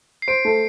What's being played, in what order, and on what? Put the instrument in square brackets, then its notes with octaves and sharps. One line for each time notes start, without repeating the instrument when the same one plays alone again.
[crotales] C7
[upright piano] C5 [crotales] D7
[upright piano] A3